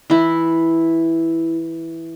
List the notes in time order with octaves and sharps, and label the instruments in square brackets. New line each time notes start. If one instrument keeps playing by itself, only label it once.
[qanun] E3 E4